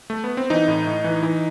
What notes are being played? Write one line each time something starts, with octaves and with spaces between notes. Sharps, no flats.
A3
B3
C4
E3 D#4
A2
A2
E3
E3